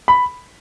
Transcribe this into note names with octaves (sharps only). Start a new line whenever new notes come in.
B5